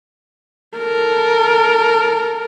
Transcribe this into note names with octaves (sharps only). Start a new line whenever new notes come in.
A4 A#4